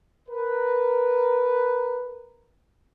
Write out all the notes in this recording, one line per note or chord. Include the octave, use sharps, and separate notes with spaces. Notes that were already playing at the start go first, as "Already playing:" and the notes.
A#4 B4